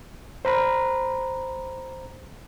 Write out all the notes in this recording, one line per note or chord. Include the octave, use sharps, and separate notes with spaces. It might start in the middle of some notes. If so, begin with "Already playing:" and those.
C5 A#5 B5